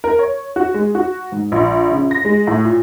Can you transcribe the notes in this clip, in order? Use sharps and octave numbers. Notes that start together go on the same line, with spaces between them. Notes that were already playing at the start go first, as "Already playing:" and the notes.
A#4
C#5
F#4
G#3
F#4
G#2
A#1
C#3
A#6
G#3
A2
A#2